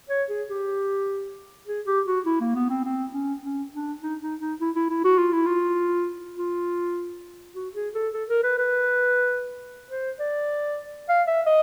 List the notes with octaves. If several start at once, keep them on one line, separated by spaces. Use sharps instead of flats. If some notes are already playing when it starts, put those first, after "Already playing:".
C#5
G#4
G4
G#4
G4
F#4
E4
A#3
B3
C4
C4
C#4
C#4
D4
D#4
D#4
D#4
E4
E4
E4
F#4
F4
E4
F4
F4
F#4
G#4
A4
A4
A#4
B4
B4
C5
D5
F5
E5
D#5